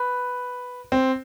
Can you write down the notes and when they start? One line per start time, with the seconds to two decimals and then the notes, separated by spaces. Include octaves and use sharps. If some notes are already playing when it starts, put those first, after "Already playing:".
Already playing: B4
0.92 C4